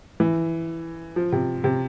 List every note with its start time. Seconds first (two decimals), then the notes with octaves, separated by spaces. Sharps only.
0.20 E3
1.16 F3
1.32 C3
1.64 C3